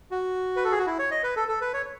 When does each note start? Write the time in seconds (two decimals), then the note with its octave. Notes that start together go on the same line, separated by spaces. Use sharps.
0.11 F#4
0.56 B4
0.64 A4
0.72 G#4
0.79 F#4
0.87 E4
0.99 C#5
1.11 D#5
1.23 B4
1.36 A4
1.48 A4
1.61 B4
1.74 C#5